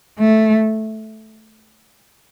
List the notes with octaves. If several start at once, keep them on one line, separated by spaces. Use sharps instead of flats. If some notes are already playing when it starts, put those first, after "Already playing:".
A3